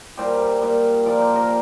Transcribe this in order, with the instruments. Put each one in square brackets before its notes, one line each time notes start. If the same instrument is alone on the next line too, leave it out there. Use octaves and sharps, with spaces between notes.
[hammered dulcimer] A#2 G3 G4 C5
A#2 G3
A#2 F3 A#4 D5
G4 C5
A#4 D5